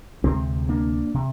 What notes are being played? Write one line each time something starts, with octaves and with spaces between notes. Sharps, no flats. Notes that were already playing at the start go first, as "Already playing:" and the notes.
D2 C3 G#3 C4
A#3 D4
C3